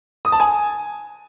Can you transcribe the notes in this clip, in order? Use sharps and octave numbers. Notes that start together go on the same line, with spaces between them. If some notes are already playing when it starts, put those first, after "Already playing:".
D#6
A5
G#5